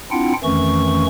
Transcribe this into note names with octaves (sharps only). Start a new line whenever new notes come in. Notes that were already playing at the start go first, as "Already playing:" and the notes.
C4 D4 E4 F4 F#5 G5
F2 D#3 E3 A3 C#4 C#6